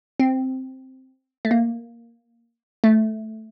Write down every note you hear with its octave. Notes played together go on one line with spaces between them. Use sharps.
C4
A3
A#3
A3